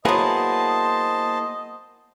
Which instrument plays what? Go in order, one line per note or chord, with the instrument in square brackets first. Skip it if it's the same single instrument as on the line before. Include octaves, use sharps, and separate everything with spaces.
[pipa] F#3 B3 [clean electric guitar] A#3 E4 G#4 [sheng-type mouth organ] C5 A5 [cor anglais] D#5